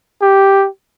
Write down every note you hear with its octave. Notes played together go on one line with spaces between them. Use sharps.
G4